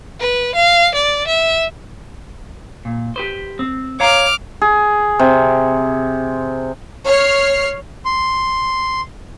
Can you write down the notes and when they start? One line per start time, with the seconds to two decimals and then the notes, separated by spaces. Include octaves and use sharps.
0.20 B4
0.55 F5
0.94 D5
1.27 E5
2.85 A#2
3.16 G4 B4 C5
3.59 C4
4.00 C#5 F5 A#5 D6 F6
4.62 G#4
5.19 C3
7.06 C#5 F6 C7
8.05 C6